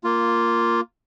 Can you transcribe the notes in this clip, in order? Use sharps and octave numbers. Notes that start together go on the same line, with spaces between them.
A#3 F4